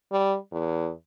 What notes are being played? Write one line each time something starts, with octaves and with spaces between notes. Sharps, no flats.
G3
E2